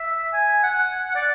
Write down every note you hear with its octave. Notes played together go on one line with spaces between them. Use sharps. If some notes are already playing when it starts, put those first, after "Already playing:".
Already playing: E5
G#5
F#5
D5